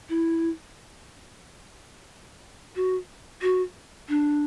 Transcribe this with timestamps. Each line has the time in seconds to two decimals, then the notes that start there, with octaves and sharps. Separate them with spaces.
0.09 E4
2.76 F#4
3.42 F#4
4.09 D4